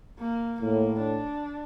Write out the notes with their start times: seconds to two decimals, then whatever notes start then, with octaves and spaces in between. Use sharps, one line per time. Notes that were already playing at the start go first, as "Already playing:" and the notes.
0.19 A#3
0.61 A2 A#3
1.01 D4